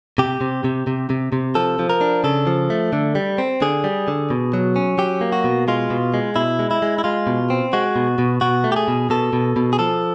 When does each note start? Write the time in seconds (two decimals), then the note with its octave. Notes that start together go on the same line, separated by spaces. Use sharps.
0.18 C3 G4
0.41 C3
0.64 C3
0.87 C3
1.10 C3
1.32 C3
1.55 F3 A4
1.79 F3
1.90 A#4
2.01 D4
2.24 C#3 A4
2.47 F3
2.70 A3
2.93 D3
3.15 G3
3.38 C4
3.62 D3 G#4
3.84 G3
4.08 D3
4.30 B2
4.53 F#3
4.76 C#4
4.98 F#3 G4
5.21 A#3
5.32 F#4
5.44 B2
5.68 G#3 F4
5.90 B2
6.14 G#3
6.36 B2 E4
6.59 G#3
6.71 E4
6.82 G#3
6.98 E4
7.04 G#3 F4
7.27 B2
7.50 C4
7.73 G#3 F#4
7.96 B2
8.18 B2
8.41 B2 F#4
8.64 A3
8.72 G4
8.76 G#4
8.88 B2
9.10 B2 A4
9.33 B2
9.56 B2
9.73 G#4
9.79 F3 A4